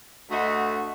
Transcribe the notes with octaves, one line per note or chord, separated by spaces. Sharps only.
D2 A3 F#4 D#5 F#5